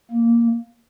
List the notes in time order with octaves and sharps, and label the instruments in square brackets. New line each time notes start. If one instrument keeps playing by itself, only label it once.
[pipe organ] A#3